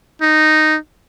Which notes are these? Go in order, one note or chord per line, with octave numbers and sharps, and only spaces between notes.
D#4